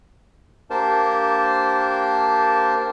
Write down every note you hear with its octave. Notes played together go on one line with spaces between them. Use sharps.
A#3 D4 G4 A#4 C5 A5